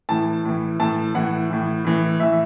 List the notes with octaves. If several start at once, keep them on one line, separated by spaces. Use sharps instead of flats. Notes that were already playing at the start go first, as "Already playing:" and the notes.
A2 E3 A5
A2 E3
A2 E3 A5
A2 E3 F#5
A2 E3
A2 E3
A2 E3 E5